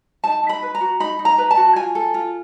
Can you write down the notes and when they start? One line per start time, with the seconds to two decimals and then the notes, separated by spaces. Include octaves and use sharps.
0.24 D#4 A5
0.43 D#4
0.49 B5
0.62 B4
0.75 A#5
0.81 F#4
1.00 D#4 B5
1.19 D#4
1.25 A#5
1.38 B4
1.51 A5
1.57 F#4
1.76 F4 G#5
1.95 A4
2.14 F4